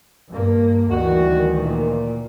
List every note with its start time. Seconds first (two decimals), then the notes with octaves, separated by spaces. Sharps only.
0.32 G2 A#3
0.91 D2 D#3 E3 G3 F#4
1.62 A#2